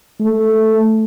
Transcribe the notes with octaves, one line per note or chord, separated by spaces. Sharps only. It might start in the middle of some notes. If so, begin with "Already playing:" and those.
A3